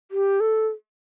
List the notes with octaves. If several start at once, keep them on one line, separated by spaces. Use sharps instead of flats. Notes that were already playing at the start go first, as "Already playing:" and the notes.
G4
A4